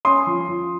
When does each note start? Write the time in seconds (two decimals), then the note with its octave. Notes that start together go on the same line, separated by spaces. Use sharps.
0.05 C#4 C6 D#6
0.27 F3
0.49 F3